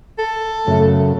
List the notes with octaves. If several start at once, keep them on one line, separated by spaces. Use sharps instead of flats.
A4
F#2 C#3 A3